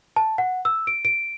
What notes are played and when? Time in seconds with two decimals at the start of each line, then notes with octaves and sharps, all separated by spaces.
0.16 A5
0.38 F#5
0.65 E6
0.87 D7
1.05 D7